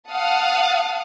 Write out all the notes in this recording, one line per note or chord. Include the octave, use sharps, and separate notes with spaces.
F5 F#5 A5 D#6